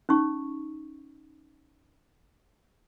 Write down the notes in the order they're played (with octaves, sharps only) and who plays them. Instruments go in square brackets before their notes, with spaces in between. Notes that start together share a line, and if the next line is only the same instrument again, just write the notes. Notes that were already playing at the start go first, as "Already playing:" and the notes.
[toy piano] C#4 D#4 C#6